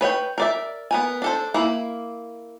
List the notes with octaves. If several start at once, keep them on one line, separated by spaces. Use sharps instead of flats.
B4 C#5 E5 G5
A#4 D5 E5
B3 A#4 G#5
D4 A4 C5
A#3 E4